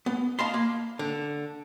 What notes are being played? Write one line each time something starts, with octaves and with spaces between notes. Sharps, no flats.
B3
D#5 F5 A5 B5 C6
A#3
D3